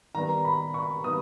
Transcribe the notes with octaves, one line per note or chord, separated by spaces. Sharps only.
D#3 G3 B3 A#5
B5
C#6
D#3 G3 B3 D#6